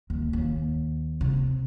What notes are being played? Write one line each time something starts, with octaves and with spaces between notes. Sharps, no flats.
D#2
D#2
C3